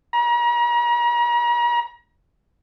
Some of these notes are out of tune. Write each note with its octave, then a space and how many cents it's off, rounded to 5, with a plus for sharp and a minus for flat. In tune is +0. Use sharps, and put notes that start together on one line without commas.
A#5 +40